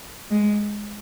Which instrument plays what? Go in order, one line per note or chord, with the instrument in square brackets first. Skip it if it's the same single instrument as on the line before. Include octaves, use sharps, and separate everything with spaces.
[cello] G#3